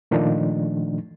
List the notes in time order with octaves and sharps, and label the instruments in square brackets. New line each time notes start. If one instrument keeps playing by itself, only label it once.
[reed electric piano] A#2 D#3 F3 A3 D4 D#4